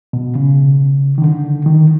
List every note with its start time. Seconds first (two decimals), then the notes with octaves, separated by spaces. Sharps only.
0.13 B2
0.35 C#3
1.18 D#3
1.22 D3
1.66 D#3